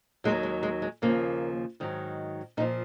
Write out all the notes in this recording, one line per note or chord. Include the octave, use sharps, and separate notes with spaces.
D#2 D#3 F#3 G#3
G#3
G#3
G#3
D#2 C#3 F3 A#3
G#2 D#3 F#3
A#2 F3 D#4